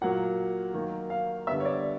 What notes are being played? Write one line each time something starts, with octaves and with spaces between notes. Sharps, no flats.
A#2 F#3 A#3 F#5
D#3 F#3 A#3
F5
D3 G3 B3 E5
C#5
D5